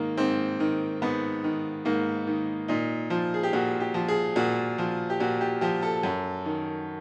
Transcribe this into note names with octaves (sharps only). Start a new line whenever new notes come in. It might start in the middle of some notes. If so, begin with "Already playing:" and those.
Already playing: G#2 D#3 A#3
G#2 C4
D#3
G#2 B3
D#3
G#2 A#3
D#3
A#2 D#4
F3
G#4
G4
A#2 F#4
G4
F3
G#4
A#2 F#4
F3
G4
A#2 F#4
G4
F3 G4
A4
F#2
D#3